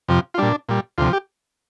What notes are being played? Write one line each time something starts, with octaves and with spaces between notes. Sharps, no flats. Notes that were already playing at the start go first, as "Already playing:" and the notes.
F2 C3 F3
F4
A#2 G3 D4
A#2 G3
D2 C3 F3 F4
G4